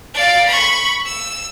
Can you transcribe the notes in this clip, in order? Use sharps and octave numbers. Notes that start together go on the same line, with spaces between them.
D5 F5
B5 C#6
E6